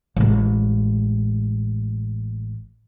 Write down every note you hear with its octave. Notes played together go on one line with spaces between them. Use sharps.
A1 G#3